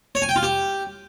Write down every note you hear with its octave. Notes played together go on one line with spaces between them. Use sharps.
C#5
G#5
G5
F4
G4